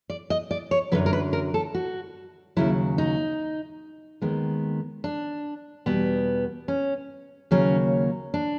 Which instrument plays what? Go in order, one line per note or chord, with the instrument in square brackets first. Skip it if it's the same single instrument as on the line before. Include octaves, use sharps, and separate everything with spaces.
[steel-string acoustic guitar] D5
D#5
D5
C#5
F#2 D3 F#3 B4
A#4
B4
A#4
A4
F#4
D#2 C#3 F#3 E4
D#4
D#2 D#3 G#3 B3
D4
E2 B2 G3 B3
C#4
D#2 C#3 F#3 A#3 C#4
D4